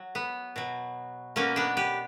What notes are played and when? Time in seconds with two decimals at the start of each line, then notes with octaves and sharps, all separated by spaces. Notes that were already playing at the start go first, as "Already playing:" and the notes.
Already playing: F#3
0.15 B3
0.56 B2 F#3
1.36 B2 F#3 A#3 C#4
1.56 B3 D4
1.77 G4 B4